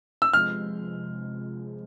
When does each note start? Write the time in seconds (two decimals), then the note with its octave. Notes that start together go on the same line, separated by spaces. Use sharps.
0.22 E6
0.33 C3 F3 G#3 F6